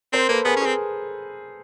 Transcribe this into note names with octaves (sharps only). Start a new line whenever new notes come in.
C4 A#4 C5
A#3 A4 B4
B3 G#4 A#4
C#4
C4 G#4 A#4